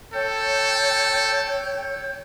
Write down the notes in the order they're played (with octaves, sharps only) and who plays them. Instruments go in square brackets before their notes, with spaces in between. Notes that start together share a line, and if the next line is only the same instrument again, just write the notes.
[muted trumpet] A4 [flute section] C#5 G5 G6